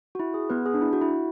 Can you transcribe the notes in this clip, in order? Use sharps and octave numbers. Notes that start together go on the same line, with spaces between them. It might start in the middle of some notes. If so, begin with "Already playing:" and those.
F#4
E4
G#4
B3 B4
G#4
D4
E4
F#4
E4